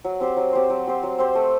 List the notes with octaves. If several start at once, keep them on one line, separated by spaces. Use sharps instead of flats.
F#3
C4 G4 C5
F#3
C4 G4 C5
F#3
C4 G4 C5
F#3
C4 G4 C5
A3